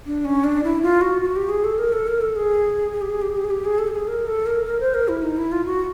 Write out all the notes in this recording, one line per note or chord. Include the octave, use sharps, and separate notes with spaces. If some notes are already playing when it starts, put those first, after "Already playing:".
D4
C#4
D4
E4
F4
F#4
F#4
G4
G#4
A4
A#4
A4
A#4
A4
G#4
G#4
G4
G#4
G4
G#4
G4
G#4
G4
G#4
A4
G4
G#4
A#4
A4
A#4
A#4
C5
A#4
E4
D#4
E4
F4
F#4